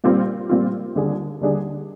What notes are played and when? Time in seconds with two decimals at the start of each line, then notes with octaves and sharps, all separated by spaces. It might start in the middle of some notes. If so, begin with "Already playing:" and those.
0.04 A#2 G3 C4 F4
0.49 A#2 G3 C4 F4
0.95 D#2 D3 G3 D4 G#4
1.41 D#2 D3 G3 D4 G#4